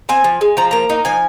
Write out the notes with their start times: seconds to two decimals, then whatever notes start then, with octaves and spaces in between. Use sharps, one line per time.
0.09 C4 G#5
0.24 F3
0.41 G#3
0.57 F3 A#5
0.71 A#3 A#5
0.90 D#4
1.05 F3 G#5